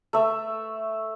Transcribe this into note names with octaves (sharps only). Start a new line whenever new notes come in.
A3 E5